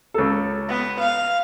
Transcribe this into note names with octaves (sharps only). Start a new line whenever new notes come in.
C#2 A4
B3
F5